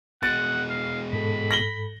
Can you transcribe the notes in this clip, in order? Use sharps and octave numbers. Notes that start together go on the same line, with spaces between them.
B2 G#3 F#5 A6
F5
G#2 A4 B5
A#6 F#7 G7